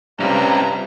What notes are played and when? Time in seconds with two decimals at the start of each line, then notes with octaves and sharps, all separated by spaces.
0.20 G2 C3 C#4 F4 A#5